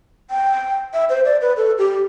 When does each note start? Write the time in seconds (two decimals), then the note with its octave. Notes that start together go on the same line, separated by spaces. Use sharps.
0.31 G5
0.94 E5
1.10 C5
1.25 D5
1.41 B4
1.57 A4
1.78 G4